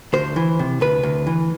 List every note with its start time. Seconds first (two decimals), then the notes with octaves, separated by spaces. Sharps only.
0.13 D2 C5
0.36 E3
0.59 C3
0.81 D2 B4
1.03 D2
1.27 E3